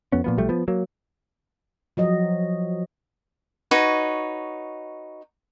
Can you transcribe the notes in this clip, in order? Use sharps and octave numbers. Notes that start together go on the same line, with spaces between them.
F2 B3 C#4
A#2 F3 B3
B1 F3 G3 A3
F3 B3
F#3 A#3
F3 F#3 D#5
D#4 F#4 B4 C#5